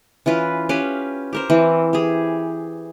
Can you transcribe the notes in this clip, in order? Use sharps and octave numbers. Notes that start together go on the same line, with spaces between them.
E3 C#4 F4 B4
C#4 G4 B4 F5
G4 A#4 C5
E3 C4
G4 G#4